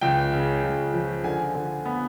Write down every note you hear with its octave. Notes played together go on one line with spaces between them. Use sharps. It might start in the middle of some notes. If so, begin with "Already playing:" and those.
C#2 G5
C#3
C#2
F3
D3 G#5
D3
B3